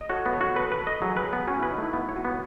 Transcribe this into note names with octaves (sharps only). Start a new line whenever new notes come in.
D#5
F#4 A4 C#5
B3
A4 C#5
F#4
A4 B4
B4
A4
D#5
F#3 G#4
B4
G#4
B3
C#4 F#4
E4
B4
D#4
A3 E4
B3 E4
C#5
F#4
B3